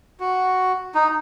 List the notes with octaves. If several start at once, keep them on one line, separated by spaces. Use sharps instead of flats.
F#4
D#4